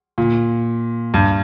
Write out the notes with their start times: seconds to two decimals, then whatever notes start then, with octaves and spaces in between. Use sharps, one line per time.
0.18 A#2
1.14 G2